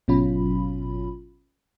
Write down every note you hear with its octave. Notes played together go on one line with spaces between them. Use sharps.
G#1 B2 F#3 C#4 F4 B5